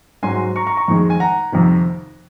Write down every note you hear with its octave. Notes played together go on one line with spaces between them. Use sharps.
G#2 F#3 G#5 C6
A#5 C#6
A#5 C#6
A#5 C#6
F2 D#3 G#3
G#5
F#5 A#5
F2 C3 D#3